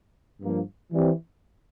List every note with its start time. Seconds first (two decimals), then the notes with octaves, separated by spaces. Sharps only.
0.41 G2 F3 A#3
0.92 E3 G3 C4